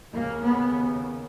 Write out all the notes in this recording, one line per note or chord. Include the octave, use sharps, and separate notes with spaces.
D#2 C#3 A#3
B3